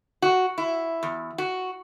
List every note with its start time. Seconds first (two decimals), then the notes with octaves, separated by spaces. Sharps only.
0.22 F#4
0.58 E4
1.03 E2
1.38 F#4